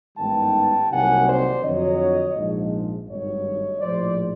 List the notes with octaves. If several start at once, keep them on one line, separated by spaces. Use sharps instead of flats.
A1 G#2 D#3 G3 B3 G5 A5
C2 C3 D#3 F#3 A#3 F#5 G#5
C5 D5
F2 D3 F#3 C#5 D#5
A#1 G#2 F3
G#1 G2 D#3 F#3 A3 C#5 D#5
A#1 A2 F3 C5 D5